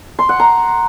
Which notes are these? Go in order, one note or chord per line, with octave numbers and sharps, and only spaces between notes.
C6
F#5
A#5